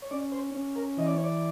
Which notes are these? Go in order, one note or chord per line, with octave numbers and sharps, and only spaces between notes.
C#5
C#4 D5
C5
C#4
A#4
E3 D#5
D5
C#5
D5